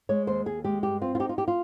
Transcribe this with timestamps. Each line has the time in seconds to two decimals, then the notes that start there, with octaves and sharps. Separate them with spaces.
0.09 G#3 C#5
0.27 D#2 C5
0.46 D#2 G#4
0.64 G#3 G4
0.83 G2 G4
1.02 C4 F4
1.15 F4
1.20 D#4 G4
1.29 F4
1.38 G4
1.48 F4